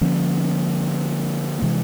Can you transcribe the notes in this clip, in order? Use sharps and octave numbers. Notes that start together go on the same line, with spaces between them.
D3 F3 A#3 C#4
C3 E3 G#3